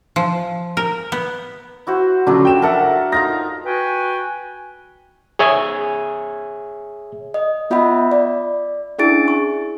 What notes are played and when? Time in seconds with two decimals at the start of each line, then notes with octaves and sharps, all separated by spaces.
0.16 F3
0.77 A#4
1.12 B3
1.87 E4 F#4 C5
2.27 C#3 F3 F#3 A3 D4
2.45 G5 E7
2.62 A4 A#4 E5 F#5 A5
3.12 D#4 F4 A#5 A#6
3.65 F#4 B4 G5 G#5
5.39 G#4 C#5 E5 G#5
7.34 D#5
7.70 B3 F4 D#5 E5 F#5 B5
8.11 D5
8.99 C#4 D4 E4 G#4 A6 D7
9.28 C#6